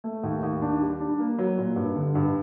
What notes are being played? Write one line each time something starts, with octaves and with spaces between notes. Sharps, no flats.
A3
D#2
D#2
D4
G3
D4
A#3
F#3
A#2
G2
D3
G2